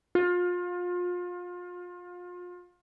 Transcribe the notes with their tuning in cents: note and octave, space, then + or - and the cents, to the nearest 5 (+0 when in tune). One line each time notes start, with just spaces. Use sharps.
F4 +30